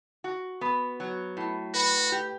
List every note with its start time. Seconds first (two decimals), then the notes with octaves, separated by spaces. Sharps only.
0.24 F#4
0.61 B3
1.00 F#3
1.37 A2
1.74 F#4 B4
2.12 G4